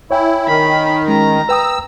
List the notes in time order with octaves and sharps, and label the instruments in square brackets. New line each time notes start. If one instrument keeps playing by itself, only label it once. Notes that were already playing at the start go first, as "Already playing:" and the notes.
[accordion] E4 [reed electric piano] C#5 G5 G#5
[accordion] D#3 [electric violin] B5
[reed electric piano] G#3 C#4 [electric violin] A#5
[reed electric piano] B4 G5 D#6 [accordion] E6